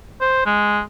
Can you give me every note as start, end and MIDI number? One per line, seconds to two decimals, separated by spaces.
0.21 0.42 72
0.46 0.80 56